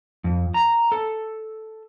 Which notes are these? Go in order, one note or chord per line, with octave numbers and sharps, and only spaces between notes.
F2
A#5
A4